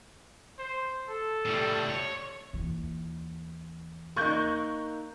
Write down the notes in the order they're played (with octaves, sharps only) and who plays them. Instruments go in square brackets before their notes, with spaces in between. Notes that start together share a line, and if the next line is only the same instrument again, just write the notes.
[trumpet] C5
A4
[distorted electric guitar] A2 G3
C#5
[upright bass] D#2 E3
[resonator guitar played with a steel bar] A#3 D#4 [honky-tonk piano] C#6 F#6 G6